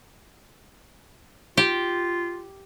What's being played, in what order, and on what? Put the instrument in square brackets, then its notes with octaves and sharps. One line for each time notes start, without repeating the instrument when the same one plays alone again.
[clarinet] F4 [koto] G4